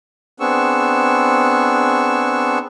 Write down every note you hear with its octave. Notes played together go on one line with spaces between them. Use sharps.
B3 C4 D4 G#4 C#6 E6